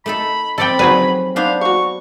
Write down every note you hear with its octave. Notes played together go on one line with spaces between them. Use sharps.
A3 D#4 A4 B5
F3 C4 A4 D5 D#5 G5 B5
D#3 F#3 F#4 G#4 B4 D5
B3 D4 D#4 C5 F5
F#4 F5 C#6